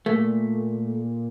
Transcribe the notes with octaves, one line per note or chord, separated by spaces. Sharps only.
A#2 A3